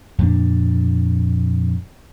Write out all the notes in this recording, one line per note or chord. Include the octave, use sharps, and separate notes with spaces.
F2 A#2 D4